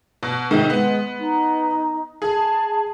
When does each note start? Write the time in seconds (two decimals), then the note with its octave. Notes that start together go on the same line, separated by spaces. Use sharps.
0.23 B2
0.51 G#2 C3 D#3
0.70 G#3 B3
1.19 D#4
2.22 G#4 A5